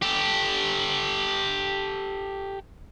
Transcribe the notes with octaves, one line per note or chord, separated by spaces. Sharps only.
G4 A4